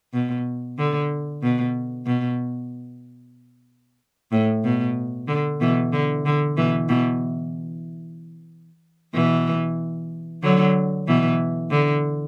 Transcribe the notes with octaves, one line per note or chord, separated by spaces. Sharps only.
B2
D3
B2
B2
A2
B2
D3
B2 E3
D3
D3
B2 E3
B2 E3
B2 E3
D3 F#3
B2 E3
D3